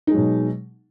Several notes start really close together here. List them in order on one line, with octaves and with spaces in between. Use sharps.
D#4 G#3 F#3 B2